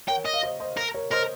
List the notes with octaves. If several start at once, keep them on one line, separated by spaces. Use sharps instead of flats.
A#4 C#5 G5
D#5
F5
C5 D#5
C5 D#5
A#4
A#4 C#5
A#4 C5 D#5